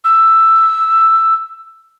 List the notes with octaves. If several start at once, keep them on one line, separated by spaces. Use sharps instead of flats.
E6